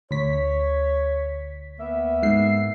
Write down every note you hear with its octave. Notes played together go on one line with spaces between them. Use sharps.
D2 C#5 B6
A#3 B3 E5
G#2 C7